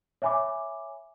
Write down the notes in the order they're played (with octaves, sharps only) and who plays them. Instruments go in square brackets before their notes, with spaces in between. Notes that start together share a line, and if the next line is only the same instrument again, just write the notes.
[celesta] C#5 E5 G#5 B5 D6